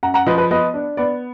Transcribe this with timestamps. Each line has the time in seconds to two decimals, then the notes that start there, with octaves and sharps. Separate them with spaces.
0.03 F#2 F#5 A#5
0.14 F#5 A#5
0.27 F3 B4 D#5
0.38 B4 D#5
0.51 B3 B4 D#5
0.74 D4
0.97 B3 D5